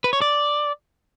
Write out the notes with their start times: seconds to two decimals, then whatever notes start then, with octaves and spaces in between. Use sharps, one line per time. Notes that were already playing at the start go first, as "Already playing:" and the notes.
0.04 B4
0.13 C#5
0.22 D5